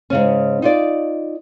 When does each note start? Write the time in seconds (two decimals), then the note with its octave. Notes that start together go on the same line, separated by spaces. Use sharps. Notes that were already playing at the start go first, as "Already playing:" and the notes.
0.10 G#2 C#3 C#4
0.62 D#4 F4 D5